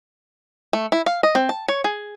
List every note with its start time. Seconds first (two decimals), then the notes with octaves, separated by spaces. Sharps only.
0.73 A3
0.92 E4
1.06 F5
1.23 D#5
1.35 C4
1.49 A5
1.68 C#5
1.84 G#4